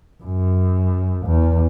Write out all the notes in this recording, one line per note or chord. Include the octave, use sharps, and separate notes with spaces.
F#2
E2